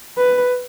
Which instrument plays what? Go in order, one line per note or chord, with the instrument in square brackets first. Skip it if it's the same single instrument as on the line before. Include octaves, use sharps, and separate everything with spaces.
[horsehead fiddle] B4